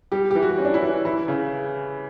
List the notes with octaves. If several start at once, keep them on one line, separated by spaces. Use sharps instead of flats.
G3 G4
E3 G4
F#4
C#4
D4
E4
E3
E3 E4
C#3